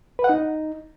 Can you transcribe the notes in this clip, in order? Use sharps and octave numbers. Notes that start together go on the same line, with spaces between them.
B4
F#5
D#4